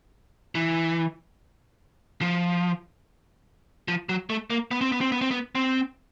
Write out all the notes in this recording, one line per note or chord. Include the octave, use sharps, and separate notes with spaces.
E3
F3
F3
F#3
A3
A#3
B3
C4
B3
C4
B3
C4
B3
C4